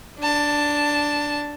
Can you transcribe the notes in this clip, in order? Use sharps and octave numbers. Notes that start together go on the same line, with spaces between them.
D4 A5